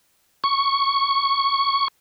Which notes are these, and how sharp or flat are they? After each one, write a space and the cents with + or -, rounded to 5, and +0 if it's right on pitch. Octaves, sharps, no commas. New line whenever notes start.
C#6 +0